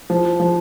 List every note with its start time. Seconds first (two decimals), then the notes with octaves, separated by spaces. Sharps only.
0.10 F3
0.40 F3